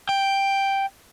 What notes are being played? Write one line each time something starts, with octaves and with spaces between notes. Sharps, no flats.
G5